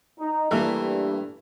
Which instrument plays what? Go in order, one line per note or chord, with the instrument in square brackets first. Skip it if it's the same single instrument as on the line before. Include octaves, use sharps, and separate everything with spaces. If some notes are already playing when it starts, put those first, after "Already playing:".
[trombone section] D#4
[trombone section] G2 [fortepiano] E3 E5 [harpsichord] A3 A#3